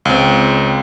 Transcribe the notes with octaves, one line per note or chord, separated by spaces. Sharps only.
C#2 C4